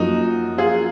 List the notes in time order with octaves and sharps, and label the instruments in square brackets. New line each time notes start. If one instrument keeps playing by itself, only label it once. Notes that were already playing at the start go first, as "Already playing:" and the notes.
Already playing: [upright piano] F#2 F3 A#3 [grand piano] D#4 F#4
[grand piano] F4 G#4